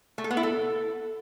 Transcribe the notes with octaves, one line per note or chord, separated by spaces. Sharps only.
A3
A4
B3
E4
A4